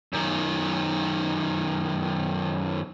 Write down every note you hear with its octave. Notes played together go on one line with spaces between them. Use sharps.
F#2 D#3